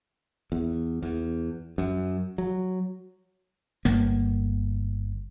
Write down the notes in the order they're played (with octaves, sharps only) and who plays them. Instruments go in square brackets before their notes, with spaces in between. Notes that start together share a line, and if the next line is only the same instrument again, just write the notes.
[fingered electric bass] E2
E2
F#2
F#3
[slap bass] G1 A#3